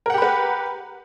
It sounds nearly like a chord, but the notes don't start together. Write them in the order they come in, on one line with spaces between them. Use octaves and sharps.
A#4 F#5 G4 B5 B4